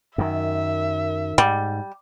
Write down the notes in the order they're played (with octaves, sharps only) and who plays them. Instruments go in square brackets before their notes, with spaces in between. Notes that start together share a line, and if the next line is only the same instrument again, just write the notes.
[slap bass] F#2 D#3 [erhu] E5
[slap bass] G#2 [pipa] G3